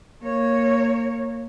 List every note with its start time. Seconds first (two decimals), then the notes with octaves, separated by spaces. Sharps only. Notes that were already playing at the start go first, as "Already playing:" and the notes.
0.23 A#3 C#5